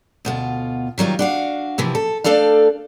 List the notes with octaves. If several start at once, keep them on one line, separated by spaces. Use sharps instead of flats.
D2 B2 F4
D#3 F#3 G3 F4
D4 F#4 F5
D#2 C3 E3 F3
A4
A3 D4 A4 D5 F5